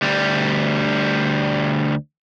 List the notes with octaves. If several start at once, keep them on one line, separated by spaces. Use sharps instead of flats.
D2 G3